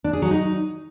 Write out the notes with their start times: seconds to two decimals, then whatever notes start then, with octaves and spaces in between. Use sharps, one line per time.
0.04 D4
0.13 G#4
0.22 F#3
0.31 D#4